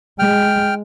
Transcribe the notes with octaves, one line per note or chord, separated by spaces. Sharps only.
G#3 G5 F6